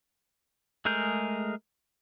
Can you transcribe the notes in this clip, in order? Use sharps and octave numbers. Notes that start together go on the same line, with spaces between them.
G#3 A3 G#4 A#4 G6